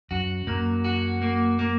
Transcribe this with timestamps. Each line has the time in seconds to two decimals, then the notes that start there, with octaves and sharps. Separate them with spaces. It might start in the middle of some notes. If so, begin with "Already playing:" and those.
0.11 F#2 F#4
0.47 F#2 A#3
0.84 F#4
1.22 A#3
1.59 A#3